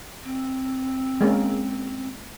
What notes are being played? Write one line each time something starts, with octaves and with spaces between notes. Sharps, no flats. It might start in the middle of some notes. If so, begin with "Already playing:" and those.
C4
G#3 A#3 C#4